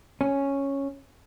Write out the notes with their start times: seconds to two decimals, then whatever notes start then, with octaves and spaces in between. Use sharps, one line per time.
0.21 C#4